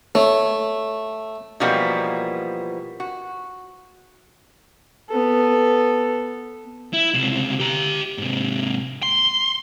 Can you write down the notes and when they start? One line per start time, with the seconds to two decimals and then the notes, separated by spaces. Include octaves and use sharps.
0.15 A3 C#5
1.60 B2 E3 F3 G3 A#3 B3
3.00 F#4
5.10 B3 A4
6.93 E4
7.14 C#2 C3
7.60 G4 A#5
8.18 G#2 C3
9.03 C6